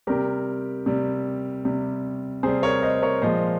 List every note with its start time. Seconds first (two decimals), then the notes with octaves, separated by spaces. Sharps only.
0.07 C3 G3 G4 A#4
0.86 C3 G3
1.65 C3 G3
2.43 C3 G3 G#4 C5
2.63 A#4 C#5
2.82 C5 D#5
3.02 A#4 C#5
3.22 A#2 F3 G#3 C5 D#5